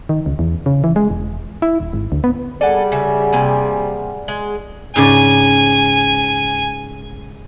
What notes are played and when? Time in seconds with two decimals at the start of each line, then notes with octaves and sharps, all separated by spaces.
0.09 D#3
0.26 C#2
0.39 E2
0.66 C#3
0.84 E3
0.96 G#3
1.10 E1
1.62 E4
1.80 D#1
1.93 G#1
2.12 D2
2.24 B3
2.61 G3 G#4 A4 D5 F#5 G#5
2.92 C#3 E5
3.33 C3 A#3 G#5
4.28 G#3
4.96 G#2 C#3 D5 G#5